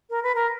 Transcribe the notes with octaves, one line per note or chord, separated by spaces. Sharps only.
A#4
B4
A#4